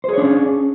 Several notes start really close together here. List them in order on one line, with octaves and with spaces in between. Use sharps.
C5 G#4 C#5 D4 C#4